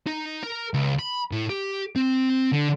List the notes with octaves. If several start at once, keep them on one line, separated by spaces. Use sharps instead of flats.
D#4
A#4
C#2
B5
A2
G4
C4
D3